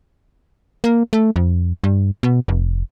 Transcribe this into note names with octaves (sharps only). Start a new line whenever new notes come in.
A#3
A3
F2
G2
B2
F1